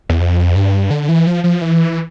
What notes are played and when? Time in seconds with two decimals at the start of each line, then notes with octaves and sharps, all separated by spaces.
0.09 E2
0.20 F2
0.55 G2
0.91 D3
1.09 E3
1.27 F3
1.44 F3
1.62 E3